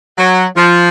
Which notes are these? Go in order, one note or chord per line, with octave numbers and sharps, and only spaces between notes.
F#3
F3